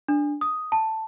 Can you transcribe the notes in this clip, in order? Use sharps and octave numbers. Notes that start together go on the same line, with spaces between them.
D4
D#6
A5